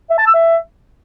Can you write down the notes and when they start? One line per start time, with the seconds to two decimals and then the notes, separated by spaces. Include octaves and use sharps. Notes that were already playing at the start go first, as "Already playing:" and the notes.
0.10 E5
0.18 A5
0.26 E6
0.34 E5